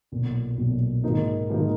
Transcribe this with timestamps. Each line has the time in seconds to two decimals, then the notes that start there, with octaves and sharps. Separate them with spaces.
0.12 B1 A#2 F#3
0.57 B1 A#2 F#3
1.04 G#2 D#3 A#3 D#4
1.50 G#2 D#3 A#3 D#4